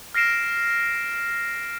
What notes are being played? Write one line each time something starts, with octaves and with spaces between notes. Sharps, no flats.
F6 A#6 C7 D7 E7